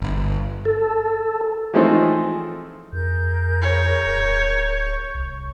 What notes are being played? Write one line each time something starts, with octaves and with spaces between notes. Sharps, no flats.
G1
A4
E3 F3 G#3 A3 C4 D#4
F2 G#4 A#4 G6
C#5
D1
C#6 G6
C2